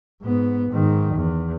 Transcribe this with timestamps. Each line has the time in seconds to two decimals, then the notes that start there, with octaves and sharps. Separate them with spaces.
0.22 G#2 B3
0.71 G#2 D#3
1.15 E2